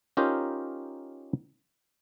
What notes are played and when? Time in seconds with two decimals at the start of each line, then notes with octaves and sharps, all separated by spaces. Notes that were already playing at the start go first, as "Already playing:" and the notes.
0.17 C#4 D#4 F4 G4 A#4 C5